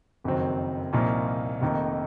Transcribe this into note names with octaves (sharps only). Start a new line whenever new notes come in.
F#1 F2 D#3 F#3 C4
C2 A#2 F3 A#3 D#4
F1 F2 D#3 A#3 D#4